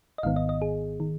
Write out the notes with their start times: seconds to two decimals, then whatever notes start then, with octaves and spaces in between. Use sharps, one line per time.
0.18 D#5
0.23 G#1 G#2 D#3 B3 F5
0.36 D#5
0.49 D#5
0.62 G#4
1.00 D#3